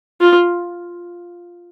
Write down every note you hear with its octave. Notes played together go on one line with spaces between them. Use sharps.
F4